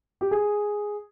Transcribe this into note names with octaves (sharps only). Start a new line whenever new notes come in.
G4
G#4